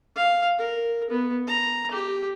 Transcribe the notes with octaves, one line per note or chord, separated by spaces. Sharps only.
F5
A#4
B3
A#5
G4